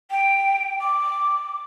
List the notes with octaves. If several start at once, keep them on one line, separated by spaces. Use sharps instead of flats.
G5
D6